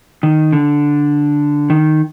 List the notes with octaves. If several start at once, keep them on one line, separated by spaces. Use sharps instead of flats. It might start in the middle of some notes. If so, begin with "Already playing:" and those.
D#3
D3
D#3